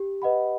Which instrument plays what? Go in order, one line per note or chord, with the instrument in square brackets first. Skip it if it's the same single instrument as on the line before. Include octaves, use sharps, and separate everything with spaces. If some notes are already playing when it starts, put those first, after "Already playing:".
Already playing: [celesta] G4
B4 D#5 F#5 B5